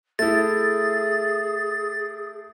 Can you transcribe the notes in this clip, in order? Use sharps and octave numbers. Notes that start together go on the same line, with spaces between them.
A3 E4 G#4 A6